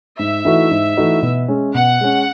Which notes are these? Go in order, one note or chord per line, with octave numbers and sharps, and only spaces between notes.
G#2 E5
E3 A3 D#4 F#4
G#2
E3 A3 D#4 F#4
B2
G#3 C#4
B2 F#5
G#3 C#4